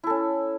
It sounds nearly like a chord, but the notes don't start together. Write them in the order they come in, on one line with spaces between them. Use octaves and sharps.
E4 A4 C#4